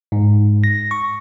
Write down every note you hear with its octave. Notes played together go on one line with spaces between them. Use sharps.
G#2
A#6
C#6